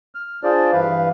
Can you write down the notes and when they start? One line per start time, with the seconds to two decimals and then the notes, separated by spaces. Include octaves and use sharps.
0.15 F6
0.44 D4 F4 G#4 C5 D5
0.73 G2 E3 B4 F5